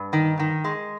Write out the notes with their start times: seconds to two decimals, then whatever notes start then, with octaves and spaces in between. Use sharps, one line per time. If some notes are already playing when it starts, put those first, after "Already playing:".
Already playing: G2
0.13 D#3
0.39 D#3
0.64 G#3